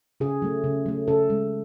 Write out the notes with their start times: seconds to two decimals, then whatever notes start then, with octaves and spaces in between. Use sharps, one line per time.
0.20 C#3 G#4
0.42 F#3 A3
0.64 C#3
0.86 F#3 A3
1.08 C#3 A4
1.30 G#3